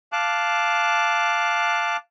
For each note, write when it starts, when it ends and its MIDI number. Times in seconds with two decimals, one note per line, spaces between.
0.12 1.96 77
0.12 1.96 81
0.12 1.96 86
0.12 1.96 90